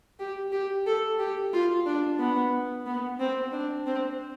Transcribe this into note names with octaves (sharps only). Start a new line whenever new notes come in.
G4
G4
A4
G4
F4
D4
B3
B3
C4
D4
C4